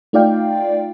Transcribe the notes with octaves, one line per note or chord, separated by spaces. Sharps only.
A3 D#4 F4 D5 F5 G5